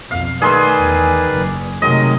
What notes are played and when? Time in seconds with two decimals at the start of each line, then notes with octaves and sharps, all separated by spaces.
0.11 B1 F2 F5
0.42 D#3 A3 G#4 B4 D5 C6 E6
0.77 E2
1.30 F#1
1.82 C3 D#3 F#3 G#3 A3 D#5